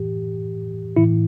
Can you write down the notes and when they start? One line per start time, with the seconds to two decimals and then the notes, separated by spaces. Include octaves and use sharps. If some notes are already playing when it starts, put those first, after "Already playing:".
Already playing: A2 E3 G4
0.96 A2 E3 E4